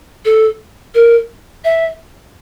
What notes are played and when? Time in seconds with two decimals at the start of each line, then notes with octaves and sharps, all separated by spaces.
0.25 A4
0.95 A#4
1.65 E5